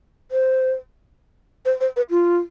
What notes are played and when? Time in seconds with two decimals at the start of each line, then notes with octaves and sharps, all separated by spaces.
0.31 C5
1.66 C5
1.81 C5
1.96 B4
2.10 F4